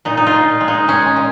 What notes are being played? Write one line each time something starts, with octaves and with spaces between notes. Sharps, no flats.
A#2 D#4
D#4
F4
A#2
G#3
D#4
G#3 C#4
A#2